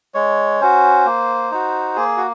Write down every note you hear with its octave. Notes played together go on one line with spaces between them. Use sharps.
G#3 C#5
C#4 F#4 C5
A#3
D#4 F#4
A#3 G#4
F#4